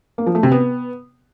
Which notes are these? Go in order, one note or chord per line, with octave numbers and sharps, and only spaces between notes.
A#3
F3
A3
C3
B3